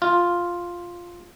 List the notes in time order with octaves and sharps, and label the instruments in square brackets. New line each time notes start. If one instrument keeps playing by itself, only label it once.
[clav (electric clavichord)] F4